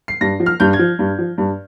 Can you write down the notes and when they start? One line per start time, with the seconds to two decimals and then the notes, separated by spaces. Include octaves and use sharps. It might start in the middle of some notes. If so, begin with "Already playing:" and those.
0.08 C7
0.21 G2 A#6
0.40 F3
0.46 F6
0.60 G2 G6
0.73 G#6
0.79 F3
0.99 G2
1.19 F3
1.38 G2